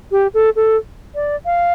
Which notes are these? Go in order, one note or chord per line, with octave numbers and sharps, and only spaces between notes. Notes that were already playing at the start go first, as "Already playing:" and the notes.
G4
A4
A4
D5
F5